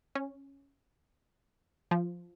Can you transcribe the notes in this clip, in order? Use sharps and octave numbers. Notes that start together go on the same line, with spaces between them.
C#4
F3